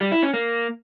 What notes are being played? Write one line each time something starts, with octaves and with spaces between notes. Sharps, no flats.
G3
E4
C#4
A#3